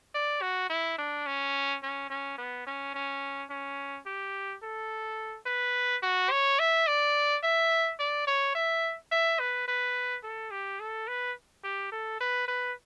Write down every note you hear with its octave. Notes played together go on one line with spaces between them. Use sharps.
D5
F#4
E4
D4
C#4
C#4
C#4
B3
C#4
C#4
C#4
G4
A4
B4
F#4
C#5
E5
D5
E5
D5
C#5
E5
E5
B4
B4
A4
G4
A4
B4
G4
A4
B4
B4